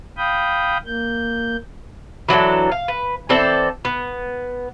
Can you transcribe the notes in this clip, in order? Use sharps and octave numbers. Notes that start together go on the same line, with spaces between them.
F5 G5 B5 D#6 G6
A#3 G6
E3 F#3 D4 A4
F5
B4
E3 C4 A4 D5
B3